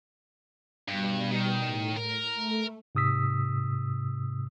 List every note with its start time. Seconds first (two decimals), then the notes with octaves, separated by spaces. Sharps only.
0.88 G2 B2 G3
1.31 D#3
1.64 A2
1.96 A#4
2.34 A3
2.95 G#2 C3 D#6 E6 B6